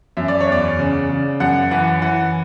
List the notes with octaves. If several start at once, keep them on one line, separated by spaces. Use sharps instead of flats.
F#2 E5
D5
C#5
E2 D5
C#3
C#3
F#2 F#5
E3 F#5
E3 F#5